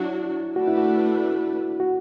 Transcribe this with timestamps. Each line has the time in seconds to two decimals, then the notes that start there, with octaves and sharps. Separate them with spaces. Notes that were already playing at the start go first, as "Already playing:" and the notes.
Already playing: F#3 D4 E4 F#4
0.56 A3 D4 F#4 B4
0.68 E4
0.77 F#4
1.80 F#4